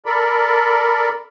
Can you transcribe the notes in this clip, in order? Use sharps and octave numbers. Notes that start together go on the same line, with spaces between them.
A4 A#4 D5 B5